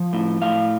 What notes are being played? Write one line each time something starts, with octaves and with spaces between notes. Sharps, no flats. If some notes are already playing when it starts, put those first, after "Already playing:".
Already playing: F3
A2
A2 F5